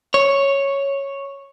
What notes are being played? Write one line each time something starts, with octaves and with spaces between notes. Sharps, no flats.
C#5